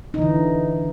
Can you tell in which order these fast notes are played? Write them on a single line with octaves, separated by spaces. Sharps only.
D#4 E3 D3